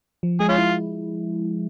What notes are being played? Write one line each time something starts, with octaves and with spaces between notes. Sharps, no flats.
F3
G#3 G#4
C#4 F4
E4